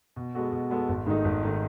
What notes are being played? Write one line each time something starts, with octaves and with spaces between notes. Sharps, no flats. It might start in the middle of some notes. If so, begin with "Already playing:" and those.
B2
G#3 B3 F#4 A4
B2
G#3 B3 F#4 A4
G#1
G#2 D#3 A3 D#4
G#1
D#3 A3 D#4